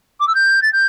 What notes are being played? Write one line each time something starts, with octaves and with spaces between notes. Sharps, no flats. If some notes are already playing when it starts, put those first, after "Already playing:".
D6
E6
G6
A6
G6